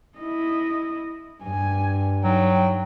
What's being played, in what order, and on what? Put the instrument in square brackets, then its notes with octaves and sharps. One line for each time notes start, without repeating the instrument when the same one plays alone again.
[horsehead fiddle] E4 D#5
[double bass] G2 [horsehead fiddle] G#5
[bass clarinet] F#3 [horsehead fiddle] D#4 G5